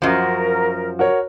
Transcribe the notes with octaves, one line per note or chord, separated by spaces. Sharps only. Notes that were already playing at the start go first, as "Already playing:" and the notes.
F#2 F3 F4 F#4 A#4
F#4 A#4 C#5